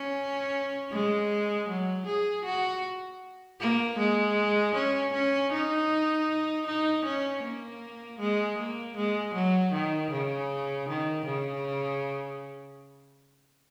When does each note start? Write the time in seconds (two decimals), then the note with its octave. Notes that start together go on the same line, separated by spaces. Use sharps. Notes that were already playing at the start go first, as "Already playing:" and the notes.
Already playing: C#4
0.92 G#3
1.69 F#3
2.07 G#4
2.45 F#4
3.60 A#3
3.98 G#3
4.75 C#4
5.13 C#4
5.52 D#4
6.66 D#4
7.05 C#4
7.44 A#3
8.20 G#3
8.58 A#3
8.97 G#3
9.34 F#3
9.72 D#3
10.11 C#3
10.88 D#3
11.26 C#3